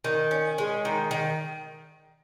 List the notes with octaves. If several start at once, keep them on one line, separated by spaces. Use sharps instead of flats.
D#3
C#4
G#3
D#3
D#3